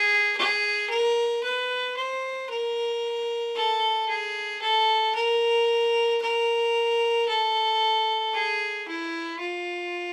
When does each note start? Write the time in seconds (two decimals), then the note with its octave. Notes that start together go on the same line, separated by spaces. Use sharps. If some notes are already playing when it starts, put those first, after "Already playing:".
Already playing: G#4
0.37 G#4
0.90 A#4
1.44 B4
1.96 C5
2.50 A#4
3.55 A4
4.09 G#4
4.62 A4
5.15 A#4
6.22 A#4
7.28 A4
8.34 G#4
8.88 E4
9.40 F4